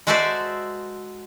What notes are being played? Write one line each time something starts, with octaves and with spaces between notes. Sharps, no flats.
G#3 F#4 A4 C5 D5 E5